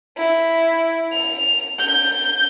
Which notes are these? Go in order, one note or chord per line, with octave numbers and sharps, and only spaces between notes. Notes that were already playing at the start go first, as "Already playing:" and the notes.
E4
F7
G6